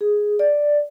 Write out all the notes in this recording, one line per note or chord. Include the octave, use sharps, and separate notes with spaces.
G#4
D5